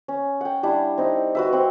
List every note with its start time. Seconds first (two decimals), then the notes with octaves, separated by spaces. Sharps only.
0.08 C#4
0.41 F#5 G5
0.63 G3 D4 E4
0.98 C4 D#4
1.35 F#4 B4 E5
1.53 C4 F#5